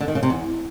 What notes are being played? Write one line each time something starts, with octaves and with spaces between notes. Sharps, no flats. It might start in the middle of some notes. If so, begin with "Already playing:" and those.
D3
D#3
C#3
C3
E2